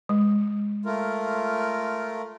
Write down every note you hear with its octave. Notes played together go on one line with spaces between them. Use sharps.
G#3
A3 F4 A#4